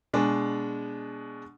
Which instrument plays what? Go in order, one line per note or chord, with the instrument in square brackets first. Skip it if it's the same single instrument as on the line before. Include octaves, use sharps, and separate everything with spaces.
[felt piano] B2 G#3 D4